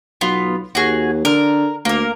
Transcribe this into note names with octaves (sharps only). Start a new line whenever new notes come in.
B1 B3 F4
D#2 F#4 G#4
D3 A#4
D2 A#3 A#4